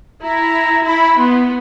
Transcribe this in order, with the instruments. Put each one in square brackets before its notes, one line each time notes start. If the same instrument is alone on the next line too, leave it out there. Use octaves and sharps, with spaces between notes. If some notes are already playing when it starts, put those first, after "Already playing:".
[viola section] E4 [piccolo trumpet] A#5
[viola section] E4 [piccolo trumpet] B5
[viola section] B3 [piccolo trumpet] C6